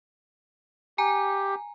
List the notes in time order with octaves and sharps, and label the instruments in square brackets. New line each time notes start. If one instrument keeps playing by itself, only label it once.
[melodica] G4 [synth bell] G#5 A#5